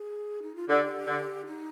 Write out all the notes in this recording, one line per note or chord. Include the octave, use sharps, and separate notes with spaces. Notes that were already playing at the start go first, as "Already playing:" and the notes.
Already playing: G#4
D#4
F4
D3 G4
D3
D#4